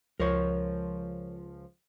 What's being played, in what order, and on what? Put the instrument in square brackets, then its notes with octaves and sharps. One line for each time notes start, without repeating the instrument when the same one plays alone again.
[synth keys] C#2 F3 [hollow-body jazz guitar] A#4 C#5